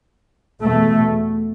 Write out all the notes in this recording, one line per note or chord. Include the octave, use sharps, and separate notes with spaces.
E2 B2 A3